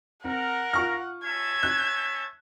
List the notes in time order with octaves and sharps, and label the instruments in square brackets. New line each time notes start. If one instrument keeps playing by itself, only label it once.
[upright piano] C4 [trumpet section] A#4 [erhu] F#5
[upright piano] F4 C#6 F6
[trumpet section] C#4 E5 A5 [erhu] G#6
[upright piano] F#6